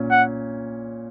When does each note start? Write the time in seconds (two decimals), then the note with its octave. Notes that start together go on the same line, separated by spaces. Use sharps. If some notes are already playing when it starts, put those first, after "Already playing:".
Already playing: A#2 C#4
0.11 F#5